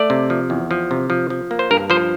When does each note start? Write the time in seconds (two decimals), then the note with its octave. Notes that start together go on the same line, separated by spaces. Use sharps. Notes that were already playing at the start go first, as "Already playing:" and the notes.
Already playing: A3 D5
0.10 C3
0.30 F3
0.50 E2
0.71 F3
0.91 C3
1.10 F3
1.30 F3
1.51 A#3
1.59 C5
1.71 G2 A#4
1.90 F3 C5